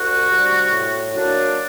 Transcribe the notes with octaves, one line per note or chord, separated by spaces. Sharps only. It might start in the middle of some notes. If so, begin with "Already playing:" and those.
Already playing: C2 F#4
C3 G3 D4
A2
F#3 A#3 D4